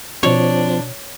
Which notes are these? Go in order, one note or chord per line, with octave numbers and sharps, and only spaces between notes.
B2 F3 C4 D4 C#5